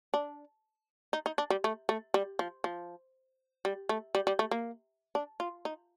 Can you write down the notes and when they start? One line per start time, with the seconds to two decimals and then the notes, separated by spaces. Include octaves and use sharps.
0.14 D4
1.13 D#4
1.26 D#4
1.38 D4
1.50 G3
1.64 A3
1.89 A3
2.14 G3
2.39 F3
2.64 F3
3.65 G3
3.89 A3
4.15 G3
4.27 G3
4.39 A3
4.51 A#3
5.15 D4
5.40 F4
5.65 D#4